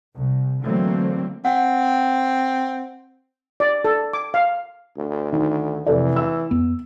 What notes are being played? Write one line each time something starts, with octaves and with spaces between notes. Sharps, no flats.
C2
D3 E3 F#3 A3 A#3 C4
C4 F#5
D5
A4
D6
F5
D2
D#3
F1 E3 A4 D5
E6
F2 B3